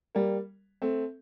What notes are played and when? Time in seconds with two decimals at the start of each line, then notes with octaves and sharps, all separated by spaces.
0.15 G3 A#3
0.82 A3 C4